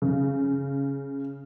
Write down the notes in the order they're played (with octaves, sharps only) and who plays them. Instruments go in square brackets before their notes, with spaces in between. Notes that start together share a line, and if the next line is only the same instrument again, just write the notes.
[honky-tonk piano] C#3